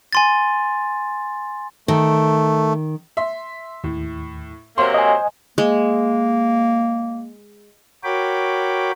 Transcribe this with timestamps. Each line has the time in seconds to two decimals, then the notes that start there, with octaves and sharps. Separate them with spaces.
0.13 G#5 C6 A6
1.88 D#3 A3
3.17 E5 C6
3.84 D#2 A2
4.78 C3 F#3 A#3 C5 C6
4.94 D#5 G#5
5.58 G#3 A#3
8.04 F#4 A#4 C#5 G5 B5 D6